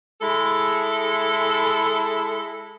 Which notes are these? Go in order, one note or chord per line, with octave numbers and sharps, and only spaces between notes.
G#3 E4 G#4 A4